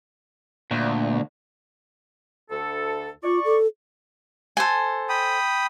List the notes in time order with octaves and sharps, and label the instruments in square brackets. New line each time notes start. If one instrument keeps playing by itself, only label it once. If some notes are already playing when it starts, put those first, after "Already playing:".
[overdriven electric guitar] D2 [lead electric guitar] A#2
[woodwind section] D2 A4
[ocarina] F4 [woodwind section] D5 C#6
[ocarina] A4
[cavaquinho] A4 C5 G#5
[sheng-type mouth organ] G5 B5 D#6